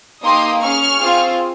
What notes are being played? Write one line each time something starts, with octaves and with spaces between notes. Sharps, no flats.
A#3 D#4 G4 C6 D#6
C#4 G#4 C#6 F6
C4 F4 G#4